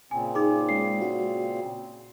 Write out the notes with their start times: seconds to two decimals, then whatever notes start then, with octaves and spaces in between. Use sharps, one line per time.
0.11 A#2 C#3 C4 G#5
0.35 D#4 G#4 D6
0.69 G#3 C#4 C7
1.02 F#4